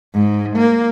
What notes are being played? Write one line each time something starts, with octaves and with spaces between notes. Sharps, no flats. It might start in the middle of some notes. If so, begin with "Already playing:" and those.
G#2
A#3